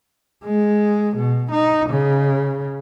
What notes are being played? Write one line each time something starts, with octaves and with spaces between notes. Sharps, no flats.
G#3
B2
D#4
C#3